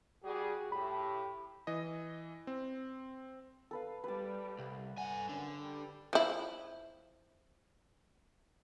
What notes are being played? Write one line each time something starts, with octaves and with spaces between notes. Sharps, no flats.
G3 F#4 G#4
A2 G4 B5
E3 D#5
C4
A4 B4 F5
G3 B4 A5
C2
G2 F#5 G#5
F#2 D3
G3
F3 E4